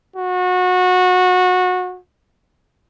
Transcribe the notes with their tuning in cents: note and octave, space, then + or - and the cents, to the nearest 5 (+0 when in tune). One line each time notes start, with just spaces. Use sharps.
F#4 -25